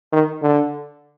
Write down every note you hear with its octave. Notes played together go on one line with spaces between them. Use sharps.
D#3
D3